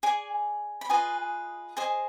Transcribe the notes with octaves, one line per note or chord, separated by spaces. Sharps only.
G#4 D5 G#5
B5
F4 G#4 B4 D#5 G#5
G#4 C5 D#5 G#5